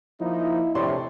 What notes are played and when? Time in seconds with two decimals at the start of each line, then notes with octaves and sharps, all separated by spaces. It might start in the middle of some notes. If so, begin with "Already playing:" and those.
0.21 F3 A#3 D#4 E4
0.75 A#1 A2 C3 C#5 D5 C6